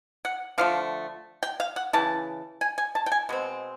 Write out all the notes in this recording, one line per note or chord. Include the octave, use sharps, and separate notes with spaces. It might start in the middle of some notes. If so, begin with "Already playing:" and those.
F#5
D3 F3 A3 F5
G5
F5
F#5
C#3 E3 A5
G#5
G#5
A5
G5
G#5
B2 G#3 C4